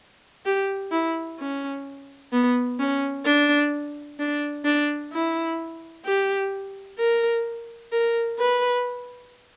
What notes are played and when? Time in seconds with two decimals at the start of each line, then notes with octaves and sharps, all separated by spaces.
0.46 G4
0.91 E4
1.39 C#4
2.33 B3
2.79 C#4
3.25 D4
4.19 D4
4.65 D4
5.12 E4
6.05 G4
6.99 A#4
7.92 A#4
8.39 B4